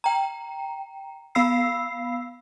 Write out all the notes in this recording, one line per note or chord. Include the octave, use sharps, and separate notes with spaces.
G5 A#5
B3 F5 B5 E6 C7